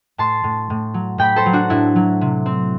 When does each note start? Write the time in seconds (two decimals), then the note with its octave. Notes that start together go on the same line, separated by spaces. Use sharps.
0.18 A2 A5 C6
0.44 A2
0.70 A2
0.94 F#3
1.18 A2 G5 B5
1.36 A4 C5
1.46 F#3
1.53 D4 F#4
1.70 A2 E4
1.96 F#3
2.21 C3
2.46 C4